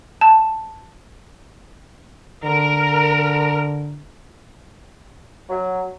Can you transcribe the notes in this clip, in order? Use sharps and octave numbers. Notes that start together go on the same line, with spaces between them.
A5
D3 A#4
F#3